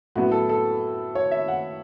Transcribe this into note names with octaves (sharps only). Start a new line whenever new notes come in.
A2 F#3 B3 F#4
A4
A4
C#5
E5
F#5